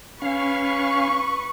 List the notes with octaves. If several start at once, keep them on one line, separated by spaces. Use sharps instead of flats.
C#4 B4 F5 C#6